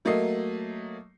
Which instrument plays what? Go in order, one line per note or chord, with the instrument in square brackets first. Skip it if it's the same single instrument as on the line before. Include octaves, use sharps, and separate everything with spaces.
[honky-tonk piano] F#3 A3 A#3 D#5 C7